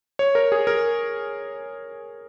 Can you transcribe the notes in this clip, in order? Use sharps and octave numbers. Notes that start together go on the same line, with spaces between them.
C#5
A#4
G#4
A#4